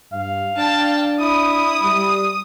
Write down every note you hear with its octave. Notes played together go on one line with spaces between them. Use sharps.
G2 F5
D4 G5 A5
E4 D#6
G3